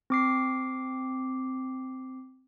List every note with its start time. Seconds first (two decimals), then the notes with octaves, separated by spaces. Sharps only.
0.10 C4 D6 C7